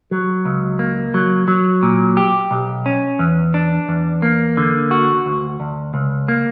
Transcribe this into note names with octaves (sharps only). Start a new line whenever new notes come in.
F#3
C#2
A#3
F#3
F#3
A#2
G4
B1
C#4
E2
D4
E2
A#3
D3
F#4
D2
D2
C#2
A#3